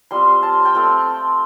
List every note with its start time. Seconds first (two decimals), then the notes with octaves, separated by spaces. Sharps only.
0.11 G3 C4 F4 C6
0.43 A5
0.65 G5
0.75 A3 C4 F4 A5